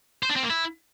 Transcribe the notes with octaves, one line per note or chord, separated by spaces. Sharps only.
C5
D4
C4
A#3
E4